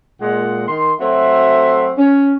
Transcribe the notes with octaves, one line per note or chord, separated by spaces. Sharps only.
A#2 G#3 F#5
D#3 C6
F#3 A3 C4 F#4 E5 C6
C#4